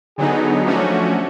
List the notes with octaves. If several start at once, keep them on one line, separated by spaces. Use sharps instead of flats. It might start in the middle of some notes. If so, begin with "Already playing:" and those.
D3 F#3 B3 D#4 G#4
F3 A3 C#4 D4 F#4